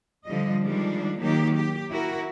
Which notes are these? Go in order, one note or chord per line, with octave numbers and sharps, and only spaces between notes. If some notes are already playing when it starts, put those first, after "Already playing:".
D3 F3 G3 D#5
D#3 F3 G3 G#3 D4
D#3 F#3 A#3 D#4 G4
G4
E4 F#4 A#4